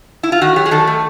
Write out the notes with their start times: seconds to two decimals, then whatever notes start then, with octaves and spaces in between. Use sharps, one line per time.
0.23 E4
0.32 F4
0.41 D#3 F#4
0.56 F#3 G4
0.66 G#4
0.71 D#3 A4
0.87 A3